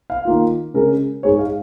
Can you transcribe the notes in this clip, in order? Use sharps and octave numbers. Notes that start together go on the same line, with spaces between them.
F5
D#3 A#3 F4
C#3 G#3 C#4 A#4
G#2 G#3 D#4 C#5
F5